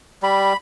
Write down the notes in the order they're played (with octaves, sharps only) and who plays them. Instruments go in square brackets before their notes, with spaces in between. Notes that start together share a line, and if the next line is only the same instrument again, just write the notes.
[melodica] G3 B5